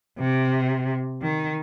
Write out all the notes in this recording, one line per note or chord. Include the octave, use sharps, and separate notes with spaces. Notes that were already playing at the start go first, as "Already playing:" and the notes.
C3
D#3